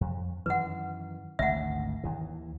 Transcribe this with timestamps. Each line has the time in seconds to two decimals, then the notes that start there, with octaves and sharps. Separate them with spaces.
0.01 F2
0.46 F#2 D#3 E3 B4 F#5
1.39 G#1 D2 G#2 E5 F#5
2.03 D#2 D#3 E3